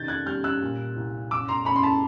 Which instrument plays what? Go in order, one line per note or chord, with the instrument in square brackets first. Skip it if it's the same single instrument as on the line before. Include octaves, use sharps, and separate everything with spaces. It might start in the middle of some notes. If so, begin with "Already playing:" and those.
Already playing: [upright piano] C3 D#3 G6 A6
F#6 G#6
G3 F6 G6
E6 F#6
A#2
C2
F#2 D6 E6
A#5 C6
F#2 B5 C#6
C6
A5 B5